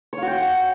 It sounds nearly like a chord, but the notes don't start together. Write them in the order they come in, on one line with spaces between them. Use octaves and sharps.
C#5 F5 F#4 G5